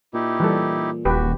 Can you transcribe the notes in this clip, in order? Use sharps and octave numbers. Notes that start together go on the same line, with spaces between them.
A#2 D#4 E4 G4
E3 G3 A4
D#1 F#4 G4 B4